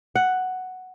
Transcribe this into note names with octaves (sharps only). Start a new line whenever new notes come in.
F#5